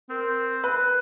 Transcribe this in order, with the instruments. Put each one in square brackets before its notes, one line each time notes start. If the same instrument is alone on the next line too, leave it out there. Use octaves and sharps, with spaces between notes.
[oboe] C4 [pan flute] A#4
[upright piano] B4 [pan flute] F#6